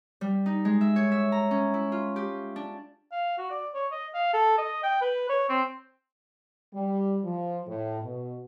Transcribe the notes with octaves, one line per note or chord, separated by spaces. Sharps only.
G3
D#4
G#3
E5
C#5
E5
A#5
C#4
E4
F4
G4
D4
F5
F#4
D5
C#5
D#5
F5
A4
D#5
G5
B4
C#5
C4
G3
F3
A2
B2